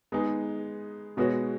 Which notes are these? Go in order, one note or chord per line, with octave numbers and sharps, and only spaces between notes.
G#3 B3 D#4 G#4
B2 G#3 B3 F#4 C#5